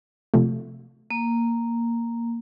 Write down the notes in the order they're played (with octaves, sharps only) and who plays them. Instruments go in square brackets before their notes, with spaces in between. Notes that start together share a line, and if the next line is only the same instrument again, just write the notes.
[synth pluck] C3 F3 A3
[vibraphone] A#3